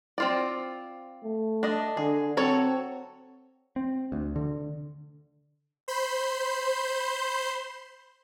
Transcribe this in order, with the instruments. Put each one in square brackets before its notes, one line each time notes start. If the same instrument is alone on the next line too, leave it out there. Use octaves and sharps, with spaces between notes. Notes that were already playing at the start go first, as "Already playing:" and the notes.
[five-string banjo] C4 F4 D5
[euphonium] A3
[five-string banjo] D4 D#5
[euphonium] D3 [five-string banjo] G#4
[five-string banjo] F#3 A4 C#5 [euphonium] C4
[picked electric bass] C4
D2
D3
[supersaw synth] C5 B5 C6 G6